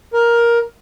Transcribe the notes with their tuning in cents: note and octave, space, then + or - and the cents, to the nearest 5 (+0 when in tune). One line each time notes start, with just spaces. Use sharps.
A#4 +10